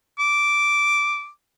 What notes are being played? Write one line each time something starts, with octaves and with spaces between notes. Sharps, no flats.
D6